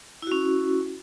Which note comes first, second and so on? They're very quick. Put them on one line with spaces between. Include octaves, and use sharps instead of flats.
E4 F#4 C#4